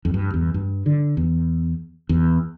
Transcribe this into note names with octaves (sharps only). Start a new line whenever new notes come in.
F2
G2
E2
G2
D3
E2
E2